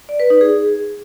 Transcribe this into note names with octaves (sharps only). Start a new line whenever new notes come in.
D5
B4
D#4
G#4